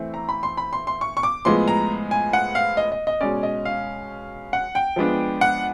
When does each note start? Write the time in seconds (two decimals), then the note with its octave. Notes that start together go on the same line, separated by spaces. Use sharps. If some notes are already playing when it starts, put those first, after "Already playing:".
Already playing: E3 A3 C4
0.14 A#5
0.29 B5
0.43 C6
0.57 B5
0.73 C6
0.87 C6
1.01 C#6
1.17 C#6
1.23 D6
1.45 A2 F3 G#3 B3 C6
1.68 A#5
2.11 G#5
2.33 F#5
2.55 F5
2.77 D#5
2.92 D#5
3.07 D#5
3.21 B2 G#3 C#4 D5
3.43 D#5
3.65 F5
4.53 F#5
4.75 G5
4.96 F3 G#3 B3 D4
5.41 F#5